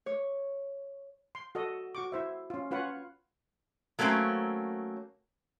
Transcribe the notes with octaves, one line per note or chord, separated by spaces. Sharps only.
C#5
C6
F#4 A4 D#5
F#4 C#6 D6
E4 C5 E5
C#4 F4
C#4 F4 B4 C#5 F#5
F#3 A3 A#3 C4 C#4